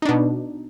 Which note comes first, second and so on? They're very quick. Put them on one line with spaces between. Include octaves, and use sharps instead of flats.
D#4 D4 B2